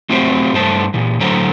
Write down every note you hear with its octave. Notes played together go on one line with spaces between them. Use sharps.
F#3 A3 C4 F4 G4 C5
G2 A3 C5 A5
A#2 E3
A2 D3 F#3 A4 C5 A#5